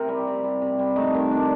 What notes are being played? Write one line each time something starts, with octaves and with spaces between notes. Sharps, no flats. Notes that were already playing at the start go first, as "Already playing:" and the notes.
Already playing: C3 A#4
G3
C3
G3
C3
G3
A3 D#4
D#3
D4